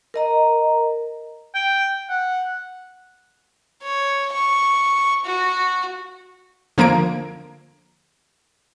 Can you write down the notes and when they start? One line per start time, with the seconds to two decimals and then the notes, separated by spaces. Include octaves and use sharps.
0.14 A#4 D#5 A#5
1.54 G5
2.10 F#5
3.83 C#5
4.33 C#6
5.25 F#4
6.78 D3 F3 A#3 A#5 G#6 D7